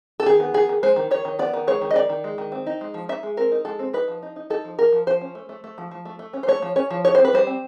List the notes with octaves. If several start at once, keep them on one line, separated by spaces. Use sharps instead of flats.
A4
D#3 G#4
B3
D#3 G#4
D#3
G#3 C5
D#3
D#3 C#5
D#3
B3 D5
D#3
G#3 C#5
D#3
D#5
D#3 D5
D#3
G#3
D#3
C4
D#4
G#3
F3
D#4 E5
G#3
C4 A#4
D#4
G#3 A4
C4
D#4 B4
F3
D#4
D#4
D#4 A4
F3
F3 A#4
F3
F3 C5
C#4
A3
A3
A3
F3
F3
A3
A3
C#4
C5
A3 C#5
F3
C#4 C#5
F3
D#4 C#5
C4 C5
B4
G3 C5
C4